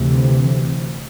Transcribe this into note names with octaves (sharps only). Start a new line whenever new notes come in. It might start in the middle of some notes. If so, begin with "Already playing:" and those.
Already playing: D2 C3 E3